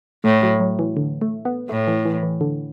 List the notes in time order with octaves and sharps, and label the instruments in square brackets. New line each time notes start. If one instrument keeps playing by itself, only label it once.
[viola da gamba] A2 [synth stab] A3
[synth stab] F#3
F#3
E3
D3
A3
B3
[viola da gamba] A2 [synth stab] A3
[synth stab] E3
E3
E3
D3